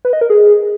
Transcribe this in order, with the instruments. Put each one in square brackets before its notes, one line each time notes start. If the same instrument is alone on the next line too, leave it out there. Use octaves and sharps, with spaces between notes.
[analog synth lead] B4
D#5
A#4
G#4